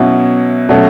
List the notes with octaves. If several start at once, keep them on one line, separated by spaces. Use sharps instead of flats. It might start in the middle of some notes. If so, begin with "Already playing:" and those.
Already playing: B2 F#3 C#4 E4
B2 F#3 A3 C#4